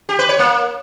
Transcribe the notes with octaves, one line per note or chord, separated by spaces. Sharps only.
G4
B4
C#5
A#3